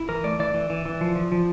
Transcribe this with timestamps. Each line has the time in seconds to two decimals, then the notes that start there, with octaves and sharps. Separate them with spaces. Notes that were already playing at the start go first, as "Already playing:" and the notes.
Already playing: E4
0.09 E3 A#4
0.24 A3 D5
0.39 E3 D5
0.54 E3
0.70 E3
0.85 E3
1.01 F3
1.16 F3
1.32 F3